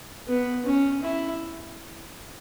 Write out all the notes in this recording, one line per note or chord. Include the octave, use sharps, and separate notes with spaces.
B3
C#4
E4